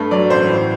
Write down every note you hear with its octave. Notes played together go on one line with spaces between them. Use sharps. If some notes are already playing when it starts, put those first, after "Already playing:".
Already playing: G2 A3
F#3 D5
A1 C5
A2